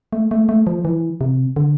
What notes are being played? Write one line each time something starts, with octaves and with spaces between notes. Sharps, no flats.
A3
A3
A3
F3
E3
C3
D3